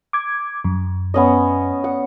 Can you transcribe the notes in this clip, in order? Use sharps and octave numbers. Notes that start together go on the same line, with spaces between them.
D6 G#6
F#2
B3 C#4 D#5
F#5